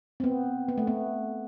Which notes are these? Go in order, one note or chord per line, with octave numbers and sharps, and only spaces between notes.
C4
B3
B3
A3
B3